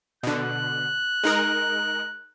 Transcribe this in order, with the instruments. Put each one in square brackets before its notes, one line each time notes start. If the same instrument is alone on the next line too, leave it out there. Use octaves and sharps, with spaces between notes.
[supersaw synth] B2 D3 [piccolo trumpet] F#6
[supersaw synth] G#3 D#4 A#4